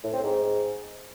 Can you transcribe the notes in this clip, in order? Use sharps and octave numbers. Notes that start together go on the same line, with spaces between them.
A2
C4
G#2